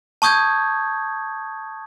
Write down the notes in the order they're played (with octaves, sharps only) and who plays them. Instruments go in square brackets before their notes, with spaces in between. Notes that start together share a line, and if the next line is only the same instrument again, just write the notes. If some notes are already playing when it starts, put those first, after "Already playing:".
[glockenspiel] A5 C#6 D#6 G6 G#6